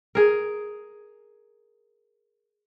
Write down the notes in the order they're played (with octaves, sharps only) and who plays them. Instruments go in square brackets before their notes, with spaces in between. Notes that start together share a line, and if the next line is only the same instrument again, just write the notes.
[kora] G#4 A#4